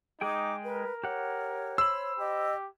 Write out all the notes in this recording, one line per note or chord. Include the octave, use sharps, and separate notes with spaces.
G#3 D#4 G#4 G5 D6
A#4 B4
G4 C#5 F#5
C5 B5 E6
G4 D#5